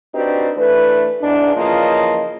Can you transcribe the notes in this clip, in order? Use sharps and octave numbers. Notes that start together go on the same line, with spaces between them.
C4 D4 D#4 F#4 G4 B4
E3 A3 D4 B4
E2 G#2 D4
C#3 E3 F3 A#3 F4 D#5